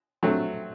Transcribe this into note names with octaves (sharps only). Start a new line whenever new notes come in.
F#3 A3 C4